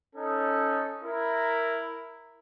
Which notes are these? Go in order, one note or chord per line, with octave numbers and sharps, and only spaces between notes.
C#4 D#4 A4
E4 A#4